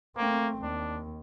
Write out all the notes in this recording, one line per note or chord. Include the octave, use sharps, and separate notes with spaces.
A3 A#3 C4
D#2 D4